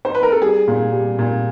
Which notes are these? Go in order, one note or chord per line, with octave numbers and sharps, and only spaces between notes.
C5
B4
A#4
A4
G3 G#4
A#2
G3
A#2